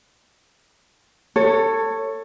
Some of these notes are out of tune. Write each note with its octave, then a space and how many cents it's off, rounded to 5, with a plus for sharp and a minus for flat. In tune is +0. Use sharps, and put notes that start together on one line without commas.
A4 +25 C#5 -5